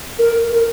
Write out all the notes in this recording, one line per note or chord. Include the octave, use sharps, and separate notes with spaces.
A#4
A#4